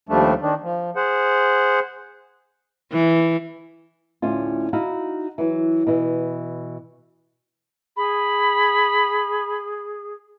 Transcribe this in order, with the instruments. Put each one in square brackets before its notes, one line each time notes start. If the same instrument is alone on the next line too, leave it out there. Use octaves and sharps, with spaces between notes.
[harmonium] D#2 F3 G3 A3 D4
D#3 D4
F3
G#4 C5 F#5
[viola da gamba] E3
[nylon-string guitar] D2 A2 C#4 F4
D#4 E4 F#4 F5
E3 F#3
B2 E3
[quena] G#4 [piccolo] B5